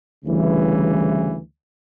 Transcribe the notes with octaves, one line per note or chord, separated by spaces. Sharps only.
D2 C#3 E3 G3